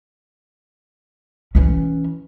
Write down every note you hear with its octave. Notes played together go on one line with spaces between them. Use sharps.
E3 C#4